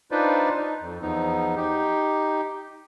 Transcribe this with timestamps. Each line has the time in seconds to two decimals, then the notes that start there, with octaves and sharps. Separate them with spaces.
0.11 D4 D#4 F4 B4 C5 D5
0.57 D#4
0.81 F2
1.02 E2 F3 B3 D#4
1.56 D#4 G4